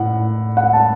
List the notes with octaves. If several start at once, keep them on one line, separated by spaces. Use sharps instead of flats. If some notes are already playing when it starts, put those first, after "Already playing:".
Already playing: A2 F#5
F#5
A5